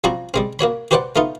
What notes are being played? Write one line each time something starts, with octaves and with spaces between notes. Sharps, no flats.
F3 G3 C4 F#4 A#5
G3 G#3 C4
A#3 F#4 C#5 B5
F#4 G4 B4 C5 D5 F#5
A3 B3 D#4 F4